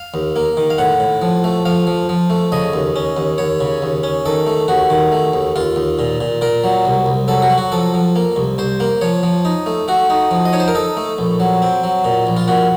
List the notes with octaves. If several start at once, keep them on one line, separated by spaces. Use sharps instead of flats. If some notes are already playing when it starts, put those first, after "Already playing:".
Already playing: F5
D#2
A#3
D#3
F5
A2 F#5
A2
F3
A3
F3 F5
F3
F3
A3
C#3 D#5
D#2
C#4
D#2
D#2 C#5
C#3
D#2
C#4
D#3 A4
A3
D#2 F#4
D#3
A3
D#2
D#2 F4
D#2
A#2
A#2
A#2 A#4
F#3
C2
C2
F#3 A4
F#4
F#3
F#4
F3 A4
F3
A#3
C2
C2 C5
A#3
F3 C#5
F3
D#4
A3
A3 F#4
D#4
F3
D#5
D#4 C#5
C5
A#4
D#4 A4
A3
A#1
F#3
C4
F#3
A#2
A#1
F4
A#2 F#4